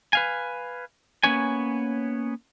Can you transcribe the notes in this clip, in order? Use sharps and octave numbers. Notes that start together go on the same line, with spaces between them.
B4 F5 G#5
A#3 B3 C#4 B4 C#5 G#5